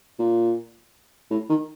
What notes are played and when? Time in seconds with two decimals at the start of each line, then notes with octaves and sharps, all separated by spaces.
0.19 A#2
1.31 A2
1.49 D#3